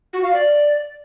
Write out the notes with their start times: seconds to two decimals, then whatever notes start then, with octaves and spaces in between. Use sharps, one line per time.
0.13 F#4
0.23 F5
0.33 D5